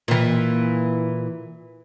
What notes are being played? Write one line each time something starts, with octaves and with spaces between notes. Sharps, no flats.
A#2 E3